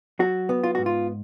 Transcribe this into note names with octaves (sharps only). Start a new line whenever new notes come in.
F#3 F#4
B3
F4
G#2 F#4
F4